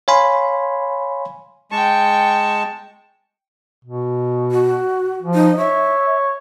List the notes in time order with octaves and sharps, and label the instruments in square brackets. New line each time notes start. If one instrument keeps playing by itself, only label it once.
[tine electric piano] C#5 F5 G#5 B5 C6
[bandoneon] G#3 A5 [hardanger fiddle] G5 C#6
[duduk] B2
[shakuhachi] F#4
[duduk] F3
[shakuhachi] D#4
[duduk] C#5 [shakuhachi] E5